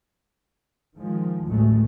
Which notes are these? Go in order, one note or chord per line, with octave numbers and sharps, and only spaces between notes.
D#3 F3 G#3
A1 D2 F#3 G#3 A3